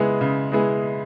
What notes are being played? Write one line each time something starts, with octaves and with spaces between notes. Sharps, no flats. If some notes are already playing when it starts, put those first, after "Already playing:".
Already playing: C#3 G#3 B3 E4 G#4
C#3
G#3 B3 E4 G#4